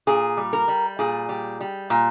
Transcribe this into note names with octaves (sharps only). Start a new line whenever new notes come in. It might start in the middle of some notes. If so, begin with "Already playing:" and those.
A#2 G#4
G3
A#4
G3
A#2 G#4
G3
G3
A#2